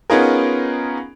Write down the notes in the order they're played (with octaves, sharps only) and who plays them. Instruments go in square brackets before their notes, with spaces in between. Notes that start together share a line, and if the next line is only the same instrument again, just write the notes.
[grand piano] B3 C#4 D#4 F4 G#4 A#4